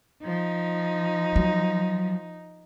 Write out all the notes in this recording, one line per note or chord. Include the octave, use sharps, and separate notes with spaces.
F3 D#4
F#3